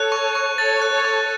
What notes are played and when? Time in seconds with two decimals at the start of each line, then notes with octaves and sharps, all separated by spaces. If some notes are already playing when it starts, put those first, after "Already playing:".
Already playing: A4 C#5 F#6
0.12 C#6
0.35 C#6
0.58 A4 C#5 A6
0.82 F#6
0.93 A4 C#5
1.05 C#6